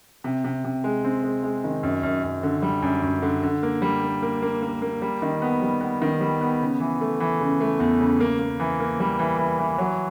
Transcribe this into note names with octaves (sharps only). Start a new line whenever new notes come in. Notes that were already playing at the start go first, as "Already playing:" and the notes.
C3
C3
C3
G#3
C4
G#3
G#3
D#3
F#2
F#2
F#2
D3
G3
F#2
F#2
D3
D3
A#3
G3
A#3
A#3
A#3
A#3
A#3
G3
D#3
B3
G3
B3
D#3
G3
B3
C#3
E3
A3
E3
C#3
A3
E2
C#3
A#3
A#3
E3
A#3
G3
E3
E3
E3
F#3